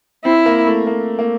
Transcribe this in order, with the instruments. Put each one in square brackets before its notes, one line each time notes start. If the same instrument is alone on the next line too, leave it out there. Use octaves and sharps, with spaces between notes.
[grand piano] C4 [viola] E4
[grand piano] A#3
A3
A#3
A#3